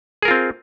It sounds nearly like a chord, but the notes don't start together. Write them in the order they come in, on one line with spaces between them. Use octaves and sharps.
G#4 A#4 F4 C4